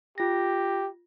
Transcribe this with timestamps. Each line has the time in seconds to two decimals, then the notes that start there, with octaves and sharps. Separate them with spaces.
0.18 F4 G4 A#6